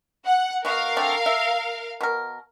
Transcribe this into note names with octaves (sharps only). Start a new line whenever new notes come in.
F#5
B2 F#4 A#4 F5
D3 A3 C4
E5
B2 A#4